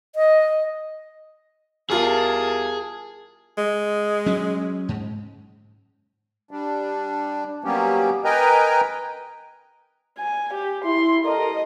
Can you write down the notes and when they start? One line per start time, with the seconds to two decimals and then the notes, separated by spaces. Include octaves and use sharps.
0.16 D#5
1.90 E2 G3 F4 G#4 A#4 A5
3.58 G#3
4.26 F#3 C#4
4.89 G#2
6.51 G3 D4
7.64 F#3 G3 A#3 B3 C#4 G4
8.24 A#4 B4 D#5 G5 G#5 A#5
10.19 G#5
10.54 G4
10.85 E4 C6
11.25 G4 A4 A#4 D#5